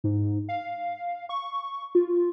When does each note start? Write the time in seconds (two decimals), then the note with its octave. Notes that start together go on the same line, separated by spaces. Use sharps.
0.04 G#2
0.49 F5
1.29 C#6
1.95 F4